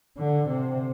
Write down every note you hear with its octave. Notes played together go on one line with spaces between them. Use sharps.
D3
C3